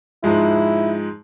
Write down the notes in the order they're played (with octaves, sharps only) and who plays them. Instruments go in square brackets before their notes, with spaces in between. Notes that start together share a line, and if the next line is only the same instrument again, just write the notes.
[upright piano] G#2 F3 G#3 [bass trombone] E4